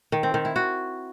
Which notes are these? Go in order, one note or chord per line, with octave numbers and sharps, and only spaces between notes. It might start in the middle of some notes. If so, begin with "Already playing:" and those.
D#3
C4
D#3
E4
F#4